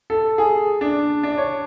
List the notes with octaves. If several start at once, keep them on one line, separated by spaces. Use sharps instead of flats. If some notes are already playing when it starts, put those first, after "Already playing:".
A4
G#4
D4
D4
C#5